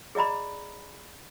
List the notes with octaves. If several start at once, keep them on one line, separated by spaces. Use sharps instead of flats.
G#4 D5 D#5 A#5 B5